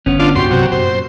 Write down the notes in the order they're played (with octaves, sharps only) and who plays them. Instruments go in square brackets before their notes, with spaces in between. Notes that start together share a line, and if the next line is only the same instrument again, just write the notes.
[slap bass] G1 G2 [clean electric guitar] B3 C#4
[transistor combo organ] D4 F4
[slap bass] C2 G2 B3 [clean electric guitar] F#4 G4 [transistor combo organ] C6
[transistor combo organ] C3 F#3
[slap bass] F#2 A#2 [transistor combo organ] C5